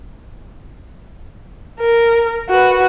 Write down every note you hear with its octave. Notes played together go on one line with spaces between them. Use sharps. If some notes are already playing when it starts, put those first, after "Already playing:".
A#4
F#4 B4